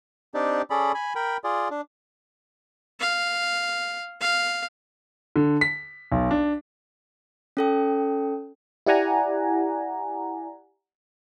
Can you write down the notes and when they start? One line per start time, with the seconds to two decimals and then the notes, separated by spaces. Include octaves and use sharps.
0.34 C4 D4 D#4 G4 D5
0.70 C#4 G#4 A4 D5 B5
0.94 G#5 B5
1.15 A#4 G5 B5
1.44 F4 G#4 D5
1.71 D4
3.01 F5
4.21 F5
5.36 D3
5.61 B6
6.12 B1
6.31 D4
7.57 C#4 A4 G5
8.86 E4 G4 D5 F#5 G#5 A#5